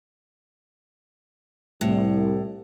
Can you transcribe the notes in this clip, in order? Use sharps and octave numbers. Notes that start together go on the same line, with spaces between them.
C2 A2